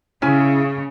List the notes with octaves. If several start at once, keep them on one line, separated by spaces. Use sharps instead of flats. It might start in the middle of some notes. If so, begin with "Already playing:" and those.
C#3 C#4 E4 G#5